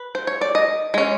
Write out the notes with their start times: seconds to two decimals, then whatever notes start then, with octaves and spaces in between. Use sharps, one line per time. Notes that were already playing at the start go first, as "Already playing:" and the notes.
Already playing: B4
0.15 C5
0.27 C#5
0.41 D5
0.55 D#5
0.94 G#3 C#4